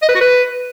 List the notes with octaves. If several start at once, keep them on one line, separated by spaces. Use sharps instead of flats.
D#5
B4
F#4
B4